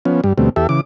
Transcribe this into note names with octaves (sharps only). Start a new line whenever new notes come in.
F3 B3 C#4
G2 G3
D2 B2 G3 A3 C4
E2 G4 A4 E5
C#3 E3 D6